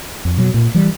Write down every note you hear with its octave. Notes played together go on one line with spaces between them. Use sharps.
F2
B2 F#3
A#2
E3 G3